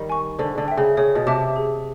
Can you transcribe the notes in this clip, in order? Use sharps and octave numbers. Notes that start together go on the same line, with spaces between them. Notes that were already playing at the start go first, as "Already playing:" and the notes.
Already playing: D#3 G3
G#5 C#6
D3 C5
D3
E5 G5
C#3
C#3 C#5
B2
C3 E5 A5 D6
G#4